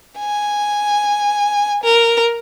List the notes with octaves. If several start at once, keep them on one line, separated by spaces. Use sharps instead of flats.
G#5
A#4